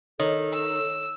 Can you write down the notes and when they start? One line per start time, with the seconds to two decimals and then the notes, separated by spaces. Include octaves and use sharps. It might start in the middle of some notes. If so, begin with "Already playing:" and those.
0.20 D#3 A4 C#5
0.53 E6